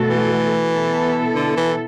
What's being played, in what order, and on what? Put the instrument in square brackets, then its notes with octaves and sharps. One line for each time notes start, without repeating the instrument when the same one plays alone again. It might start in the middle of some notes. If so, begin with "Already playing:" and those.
Already playing: [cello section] B2 A3 F#4 A4
[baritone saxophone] E3
[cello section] B2 B3 E4 A4
[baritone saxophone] D3
E3